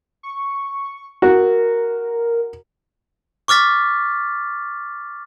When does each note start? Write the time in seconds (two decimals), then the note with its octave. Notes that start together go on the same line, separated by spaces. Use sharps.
0.23 C#6
1.22 F#4 A#4
3.48 C#6 D6 F6 A6 B6